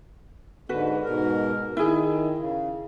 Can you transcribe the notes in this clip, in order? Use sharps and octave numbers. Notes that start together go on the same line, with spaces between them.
G#2 D3 F#4 B4
G#2 B2 A#4
D#3 E4 G#4
C#3